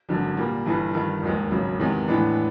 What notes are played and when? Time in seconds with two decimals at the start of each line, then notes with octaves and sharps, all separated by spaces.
0.09 G#1 F#2 D3
0.37 A#2 G3 A#3
0.66 G1 G2 E3
0.94 G1 G2 D#3
1.23 E1 D#2 D#3 G#3
1.51 G#1 F#2 C#3
1.80 E2 C3 D#3 G#3
2.08 A2 E3 G#3 B3 D4